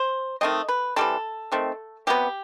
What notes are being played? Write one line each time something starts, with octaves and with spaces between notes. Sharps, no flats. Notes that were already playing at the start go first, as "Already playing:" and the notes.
Already playing: C5
D#3 A3 C4 D#5
B4
E3 G3 C4 A4
D#3 A3 C4
C3 F#3 B3 G4